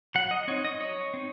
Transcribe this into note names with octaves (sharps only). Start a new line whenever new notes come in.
F#3 F#5
D#5
C4 D#4 C#5
D#5
F#3 C#5
C4 D#4